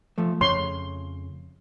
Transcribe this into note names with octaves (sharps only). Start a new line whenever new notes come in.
F3 A3
F2 C#3 A3 C#5 C6